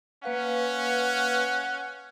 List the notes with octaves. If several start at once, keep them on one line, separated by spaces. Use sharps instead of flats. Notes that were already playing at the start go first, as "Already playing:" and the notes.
A#3 C#4 B4 F5 F#5